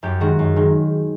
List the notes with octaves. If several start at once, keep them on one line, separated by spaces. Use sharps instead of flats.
F#2 G4
D#3 G#3 F#4
F#2
D#3 G#3